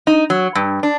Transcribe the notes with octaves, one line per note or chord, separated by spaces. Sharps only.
D#4
F#3
G2
D4